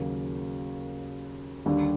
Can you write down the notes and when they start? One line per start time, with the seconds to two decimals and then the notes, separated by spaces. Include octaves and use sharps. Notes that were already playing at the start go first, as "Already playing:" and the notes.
Already playing: D#2 C#3 F#3 A#3
1.66 D#2 D3 G3